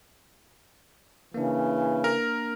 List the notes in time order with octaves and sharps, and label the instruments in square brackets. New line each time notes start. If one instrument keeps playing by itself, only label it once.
[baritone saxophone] C#3 [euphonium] E3 [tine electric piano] A#3 D4
[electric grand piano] A#4